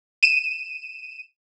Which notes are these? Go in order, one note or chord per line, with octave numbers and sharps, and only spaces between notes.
D#7 E7